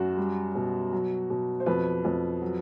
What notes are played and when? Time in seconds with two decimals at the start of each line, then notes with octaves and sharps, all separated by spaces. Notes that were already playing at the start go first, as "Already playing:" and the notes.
Already playing: F#2 F#4
0.17 G3
0.55 B2
0.93 F#3
1.30 B2
1.60 C5
1.66 F2 B4
2.05 F2
2.42 F#3